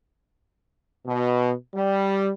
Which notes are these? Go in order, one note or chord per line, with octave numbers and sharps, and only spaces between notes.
B2
G3